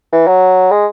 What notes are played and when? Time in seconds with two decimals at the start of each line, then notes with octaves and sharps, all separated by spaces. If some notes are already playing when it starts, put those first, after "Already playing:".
0.12 E3
0.27 F#3
0.71 G#3